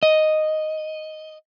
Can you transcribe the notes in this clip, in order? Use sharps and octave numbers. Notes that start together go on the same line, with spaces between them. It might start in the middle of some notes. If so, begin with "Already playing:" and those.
D#5